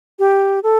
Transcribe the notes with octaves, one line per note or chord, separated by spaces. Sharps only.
G4
A4